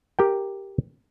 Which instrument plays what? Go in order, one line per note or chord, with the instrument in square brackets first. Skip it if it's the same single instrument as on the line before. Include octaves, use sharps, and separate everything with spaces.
[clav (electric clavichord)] G4 A#4 G5